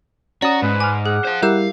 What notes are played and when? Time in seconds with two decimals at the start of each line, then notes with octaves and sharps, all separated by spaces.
0.42 C#4 F#4 D5 A#5 D#6
0.62 G#2 B4
0.80 G#5 D6 F6
1.06 G#4 F#5
1.25 C5 F5
1.43 G3 E4 G4 A#4 F5 E6 G6